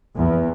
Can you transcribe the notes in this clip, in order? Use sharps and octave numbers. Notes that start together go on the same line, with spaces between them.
E2